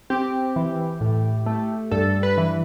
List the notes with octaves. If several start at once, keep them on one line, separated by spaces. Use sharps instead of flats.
C4 G4
E3
A2
A3
G2 A4
B4
E3